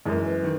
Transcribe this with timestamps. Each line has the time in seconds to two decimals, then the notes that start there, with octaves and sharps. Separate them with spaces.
0.06 F#2 E3 G#3 A#4
0.24 B4
0.43 D#3